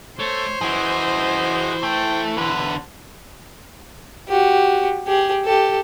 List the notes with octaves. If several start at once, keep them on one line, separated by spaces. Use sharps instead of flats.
A3 C5 C#5
E3 F#4 G#4 D#5
A3 G5
E2 D3 B4
F#4 G4
G4 G#4
G4 A4